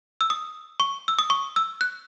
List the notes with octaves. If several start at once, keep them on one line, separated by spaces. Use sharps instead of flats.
E6
D#6
C#6
E6
D#6
C#6
E6
F#6